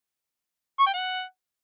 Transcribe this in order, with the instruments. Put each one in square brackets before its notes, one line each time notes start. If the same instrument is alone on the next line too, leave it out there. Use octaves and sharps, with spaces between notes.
[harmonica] C#6
G5
F#5